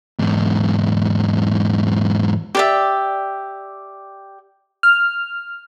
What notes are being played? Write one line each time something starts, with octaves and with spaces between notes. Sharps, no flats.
E2 G#2
G4 D5 E5
F6